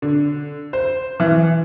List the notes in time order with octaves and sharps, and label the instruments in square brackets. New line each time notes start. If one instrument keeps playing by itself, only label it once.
[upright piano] D3
C5
E3